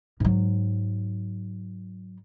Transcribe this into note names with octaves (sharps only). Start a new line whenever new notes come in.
G#2 F#3